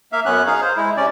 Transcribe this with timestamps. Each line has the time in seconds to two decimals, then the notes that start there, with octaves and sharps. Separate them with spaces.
0.12 A#3 E5 F5
0.26 F#2 B3 C#4 F#6
0.46 D#4 G#4 F5
0.62 C5
0.77 G#3 E4
0.97 C3 C#4 D5